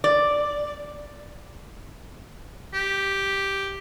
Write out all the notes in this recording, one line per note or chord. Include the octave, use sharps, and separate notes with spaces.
D5
G4